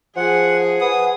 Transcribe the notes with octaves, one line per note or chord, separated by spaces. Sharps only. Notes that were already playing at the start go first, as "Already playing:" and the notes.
F3 G#4 F#5
B4 F#5 D#6